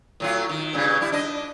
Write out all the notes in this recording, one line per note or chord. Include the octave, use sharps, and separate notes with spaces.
A2 F#3 F4
D#3
G2 A#2 C#3
G3 E4
D4 D#5